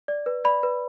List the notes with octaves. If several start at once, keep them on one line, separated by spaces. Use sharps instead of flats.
D5
B4
D5 B5
B4